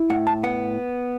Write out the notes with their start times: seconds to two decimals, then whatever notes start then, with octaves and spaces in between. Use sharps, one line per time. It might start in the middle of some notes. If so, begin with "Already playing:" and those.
Already playing: E4
0.10 A2 F#5
0.27 A5
0.43 B3 F#5